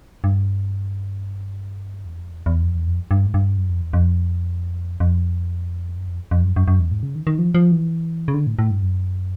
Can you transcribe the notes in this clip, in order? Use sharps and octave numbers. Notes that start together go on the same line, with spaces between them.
G2
E2
F2
E2
E2
F2
E2
F2
G2
G#2
G2
F#2
F2
E2
F2
F2
F#2
F2
F2
F#2
F#2
F#2
E2
G#2
C#3
D#3
D#3
F3
F3
E3
C#3
D3
A2
A2
G2
F#2